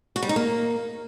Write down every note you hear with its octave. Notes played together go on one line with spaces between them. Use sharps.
F#4
G3
D#4
A#3